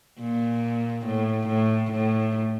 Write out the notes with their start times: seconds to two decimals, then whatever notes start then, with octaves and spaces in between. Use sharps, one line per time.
0.20 A#2
1.06 A2
1.48 A2
1.92 A2